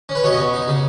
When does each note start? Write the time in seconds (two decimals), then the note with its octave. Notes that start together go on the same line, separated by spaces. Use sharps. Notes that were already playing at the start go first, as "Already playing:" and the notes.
0.09 C#4
0.15 B4
0.24 B2 C#5
0.33 D#5
0.38 B2
0.54 D#4
0.68 C#3